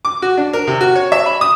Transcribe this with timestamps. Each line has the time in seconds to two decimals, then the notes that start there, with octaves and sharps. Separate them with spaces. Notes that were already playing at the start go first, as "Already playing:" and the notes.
0.05 D6
0.22 F#4
0.37 D4
0.53 A#4
0.67 C3
0.81 F#4
0.95 C#5
1.12 E5
1.26 B5
1.41 D#6